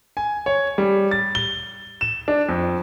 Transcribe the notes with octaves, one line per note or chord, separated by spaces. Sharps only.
G#5
C#5
G3
A6
G7
E7
D4
F2